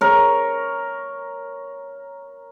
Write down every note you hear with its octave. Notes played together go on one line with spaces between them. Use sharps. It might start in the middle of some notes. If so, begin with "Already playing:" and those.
A#4 C#5